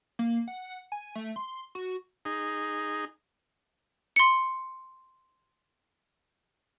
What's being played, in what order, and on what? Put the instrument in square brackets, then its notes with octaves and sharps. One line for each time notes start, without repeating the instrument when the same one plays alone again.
[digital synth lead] A#3
F#5
G#5
A3
C6
F#4
[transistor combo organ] D#4 G#4
[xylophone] C6 C#7